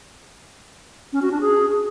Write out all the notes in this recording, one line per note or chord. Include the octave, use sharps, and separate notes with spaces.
C#4
F#4
D4
G#4